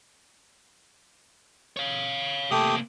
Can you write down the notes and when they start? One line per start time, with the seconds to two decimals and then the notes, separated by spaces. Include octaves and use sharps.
1.77 C#5 F5
2.51 C3 A3 A#3 G4 D#6